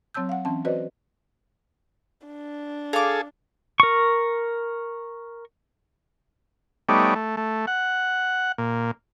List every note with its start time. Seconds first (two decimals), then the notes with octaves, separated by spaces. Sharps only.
0.14 F#3 C4 C#5 A5 E6 G6
0.29 F5 F#5
0.45 E3 C4 C#4 A5
0.65 F#4 B4 C5 D5 D#5
2.27 D4
2.93 G#4 A4 F5 D6
3.80 A#4 C#6
6.89 G3 A3 B3 D#4 C#5 D5
7.15 A3
7.37 A3
7.67 F#5
8.58 A#2